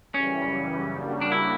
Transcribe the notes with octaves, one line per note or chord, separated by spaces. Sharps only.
F#2 C#3 E3 G3 C#4
C#3 G3 A#3 D4 F#4
D4
E4